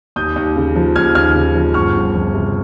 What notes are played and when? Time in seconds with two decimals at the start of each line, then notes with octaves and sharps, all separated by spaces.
0.16 D#2 D#6 G6
0.36 D#2
0.56 C#3
0.76 F3
0.96 D#2 F6 G#6
1.15 D#2 F6 G#6
1.35 C#3
1.55 F3
1.74 G1 C#6 F6
1.94 G1
2.14 F2
2.34 C3